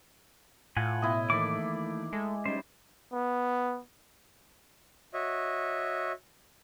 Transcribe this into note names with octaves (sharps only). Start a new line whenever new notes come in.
A2 F4 F#5 G#5
B2 E4 D#5
D#3 E3 A3 A#3 D5 D6
G#3 A3 A4
G3 C#4 D#4 C5
B3
F#4 C#5 D#5 E5